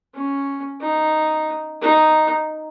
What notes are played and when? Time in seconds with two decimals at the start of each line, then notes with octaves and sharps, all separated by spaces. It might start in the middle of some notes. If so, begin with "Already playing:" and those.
0.15 C#4
0.81 D#4
1.82 D#4